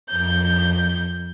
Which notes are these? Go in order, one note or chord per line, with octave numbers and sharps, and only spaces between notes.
F2 G6